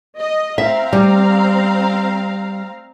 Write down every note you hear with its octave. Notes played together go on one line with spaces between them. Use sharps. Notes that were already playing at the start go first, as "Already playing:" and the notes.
D#5
C4 E5 F5 A#5
G3